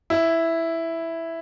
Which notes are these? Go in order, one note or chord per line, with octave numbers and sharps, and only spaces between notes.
E4